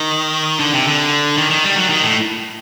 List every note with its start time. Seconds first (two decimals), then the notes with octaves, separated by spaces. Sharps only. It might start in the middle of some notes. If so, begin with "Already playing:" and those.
Already playing: D#3
0.59 D3
0.73 C3
0.86 D3
1.38 D#3
1.50 D#3
1.64 G3
1.76 F#3
1.89 D#3
2.02 A2